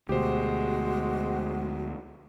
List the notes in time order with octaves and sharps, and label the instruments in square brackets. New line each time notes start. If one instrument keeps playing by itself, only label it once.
[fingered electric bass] D2 B2 [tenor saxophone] G#3 [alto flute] F#4 [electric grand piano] G4 C5